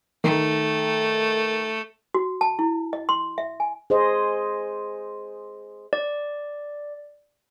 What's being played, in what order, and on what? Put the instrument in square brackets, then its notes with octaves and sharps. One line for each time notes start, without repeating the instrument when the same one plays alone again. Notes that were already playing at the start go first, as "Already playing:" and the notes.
[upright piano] D#3 [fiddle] A3
[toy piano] F#4
A5
E4
D#5
C6
E5
G#5
[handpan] G#4 C5 D#5
[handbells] D5